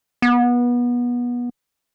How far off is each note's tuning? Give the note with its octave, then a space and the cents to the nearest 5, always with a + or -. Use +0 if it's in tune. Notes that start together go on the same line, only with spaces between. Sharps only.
B3 -25